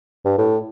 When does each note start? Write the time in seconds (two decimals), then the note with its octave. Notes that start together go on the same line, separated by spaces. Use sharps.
0.25 G2
0.38 A2